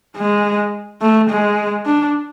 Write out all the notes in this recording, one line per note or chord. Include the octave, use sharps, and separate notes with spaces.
G#3
A3
G#3
D4